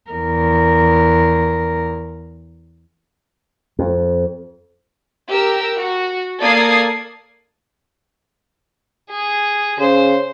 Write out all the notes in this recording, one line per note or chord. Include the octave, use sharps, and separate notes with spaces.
E2 A#4
F2
G4 A#4 E6
F#4
A#3 A4 D5 D#6 G#6 C7
G#4
C#3 C5